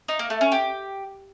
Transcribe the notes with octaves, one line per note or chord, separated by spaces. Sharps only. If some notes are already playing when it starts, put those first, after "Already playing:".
D#4
A#3
A3
C#4
G4